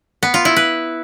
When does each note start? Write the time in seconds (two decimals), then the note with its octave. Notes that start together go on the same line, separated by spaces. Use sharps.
0.23 B3
0.34 F4
0.45 E4
0.56 B4